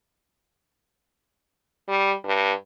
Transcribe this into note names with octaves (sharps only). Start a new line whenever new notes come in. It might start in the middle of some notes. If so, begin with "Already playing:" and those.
G3
G2